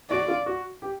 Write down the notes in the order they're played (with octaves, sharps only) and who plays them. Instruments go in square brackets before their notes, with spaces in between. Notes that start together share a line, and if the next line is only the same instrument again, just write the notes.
[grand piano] F#4 [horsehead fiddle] D5
[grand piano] F4
F#4
G4